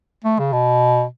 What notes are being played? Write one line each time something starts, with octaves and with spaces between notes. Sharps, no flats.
A3
C#3
B2